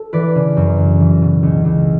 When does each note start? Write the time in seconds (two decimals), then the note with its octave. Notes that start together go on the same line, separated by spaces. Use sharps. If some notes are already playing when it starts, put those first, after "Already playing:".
Already playing: A4
0.13 E3 B4 D5
0.35 C#3
0.57 F#2
0.78 C#3
1.00 E3
1.22 B2
1.43 C#2
1.65 C#2